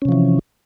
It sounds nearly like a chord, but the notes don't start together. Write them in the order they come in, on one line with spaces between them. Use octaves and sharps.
C#4 C3 F3 E3